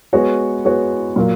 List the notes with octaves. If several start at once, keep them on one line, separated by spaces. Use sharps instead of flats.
G#3 B3 F#4 C#5
G#3 B3 F#4 C#5
A#2 F#3 A#3 F4